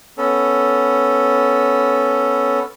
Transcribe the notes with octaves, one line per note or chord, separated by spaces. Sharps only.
B3 C#4 A4